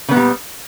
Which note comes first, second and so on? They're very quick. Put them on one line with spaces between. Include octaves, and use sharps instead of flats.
C#3 B3 A#2 G3